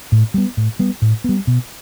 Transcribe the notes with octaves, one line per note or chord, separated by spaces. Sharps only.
A2
G3 B3
A2
G3 B3
A2
G3 B3
B2